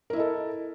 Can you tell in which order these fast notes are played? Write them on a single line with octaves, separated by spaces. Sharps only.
A#4 E4 D#5 A4